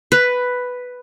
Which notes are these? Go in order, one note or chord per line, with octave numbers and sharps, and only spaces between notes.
B4